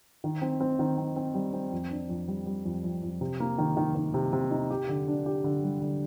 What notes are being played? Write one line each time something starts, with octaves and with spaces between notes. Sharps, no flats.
D#3
C4
C4
D#3
C4
C4
G3
C4
F2
D4
F2
G3
G3
F2
F2
F2
C3
A#3
D#3
D#3
D#3
C3
C3
D#4
G4
D3
D4
G4
D3
G3
D3